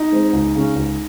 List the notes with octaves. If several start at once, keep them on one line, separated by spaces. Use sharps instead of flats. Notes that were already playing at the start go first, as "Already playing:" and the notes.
Already playing: D#4
G#3 C4
C#2
C#3 G#3 C#4
C#2